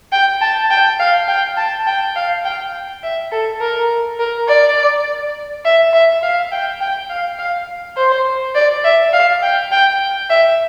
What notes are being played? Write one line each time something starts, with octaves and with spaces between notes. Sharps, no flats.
G5
A5
G5
F5
G5
A5
G5
F5
G5
E5
A4
A#4
A#4
D5
E5
E5
F5
G5
G5
F5
F5
C5
D5
E5
F5
G5
G5
E5